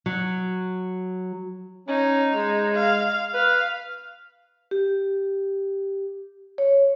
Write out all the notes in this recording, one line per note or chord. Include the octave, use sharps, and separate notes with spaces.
F#3
C#4 D#4
G#3
F5
B4 F5
G4
C#5